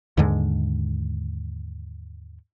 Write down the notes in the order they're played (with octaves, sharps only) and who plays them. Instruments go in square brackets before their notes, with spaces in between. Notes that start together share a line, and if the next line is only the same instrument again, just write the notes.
[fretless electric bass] D#2 G#2 D3 G#3